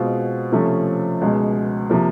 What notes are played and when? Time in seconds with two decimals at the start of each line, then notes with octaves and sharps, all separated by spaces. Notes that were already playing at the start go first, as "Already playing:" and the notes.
Already playing: B2 G#3 C4 F4 G#4
0.52 C3 F3 A3 C#4
1.21 C#2 B2 G#3
1.90 C3 F3 A#3